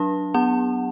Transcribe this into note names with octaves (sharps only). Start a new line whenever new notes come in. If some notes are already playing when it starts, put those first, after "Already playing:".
Already playing: F#3 D4 A5
B3 F#5